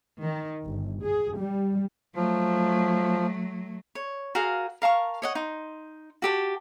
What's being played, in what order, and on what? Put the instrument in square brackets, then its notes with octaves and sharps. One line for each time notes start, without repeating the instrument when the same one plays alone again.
[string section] D#3
G1
G#4
G3
[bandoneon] F3 [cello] F#3 A3
[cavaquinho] C#5
F#4 G#4 A#4 F5
A#4 F5 A5 C#6
C#5 D#5 F#5
D#4 C6
F#4 G4 A5